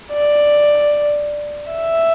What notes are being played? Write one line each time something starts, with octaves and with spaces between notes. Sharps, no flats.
D5
E5